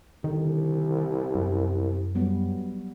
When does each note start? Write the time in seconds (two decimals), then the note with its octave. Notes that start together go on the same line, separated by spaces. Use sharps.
0.24 C2 D3 D#3
1.35 F#2
2.15 F#3 G3 B3